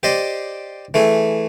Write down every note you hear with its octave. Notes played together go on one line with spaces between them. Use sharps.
G4 C5 D5 D#5
E3 A3 G#4